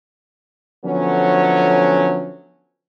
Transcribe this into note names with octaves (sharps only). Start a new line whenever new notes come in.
D3 F3 F#3 A3 B3 C#4